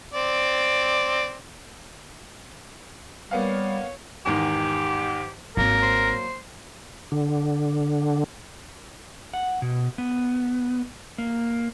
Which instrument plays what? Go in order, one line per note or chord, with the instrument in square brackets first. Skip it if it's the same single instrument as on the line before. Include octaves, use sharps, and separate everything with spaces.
[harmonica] C4 D5
[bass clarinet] G3 [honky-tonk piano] A#3 B3 F5 [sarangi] C#5
[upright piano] E2 G#2 D#3 [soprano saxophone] G4
[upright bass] G#1 [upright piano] F#3 A#3 [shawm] A#4
[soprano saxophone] C5
[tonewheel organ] D3
[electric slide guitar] F#5
B2
B3
A#3